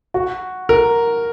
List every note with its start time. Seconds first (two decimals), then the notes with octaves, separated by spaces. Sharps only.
0.14 F#4
0.69 A#4